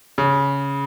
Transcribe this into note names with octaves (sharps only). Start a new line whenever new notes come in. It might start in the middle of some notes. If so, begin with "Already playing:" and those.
C#3